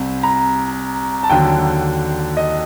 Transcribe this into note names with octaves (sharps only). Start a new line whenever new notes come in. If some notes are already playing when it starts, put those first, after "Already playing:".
Already playing: C2 C3
A#5
A5
D#2 D3 F#3 G5
D#5